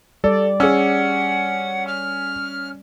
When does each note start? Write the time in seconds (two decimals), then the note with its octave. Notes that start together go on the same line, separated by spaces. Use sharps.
0.24 G3 A4 D5
0.60 C#4 G#4 F#5 E6
1.87 F6